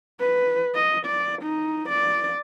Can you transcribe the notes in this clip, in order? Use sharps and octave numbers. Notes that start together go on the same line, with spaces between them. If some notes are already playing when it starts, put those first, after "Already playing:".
B4
D#5
D5
D#4
D5